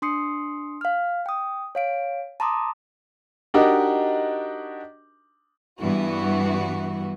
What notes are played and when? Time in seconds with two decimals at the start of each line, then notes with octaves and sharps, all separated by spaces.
0.02 D4 C6 D#6 C7 C#7
0.81 F5 F6
1.26 G5 D#6
1.75 C#5 F5 D7
2.40 A5 A#5 C6 D6 D#6
3.54 D4 D#4 F#4 G4 A#4 D#5
5.79 G2 E3 B3 F#4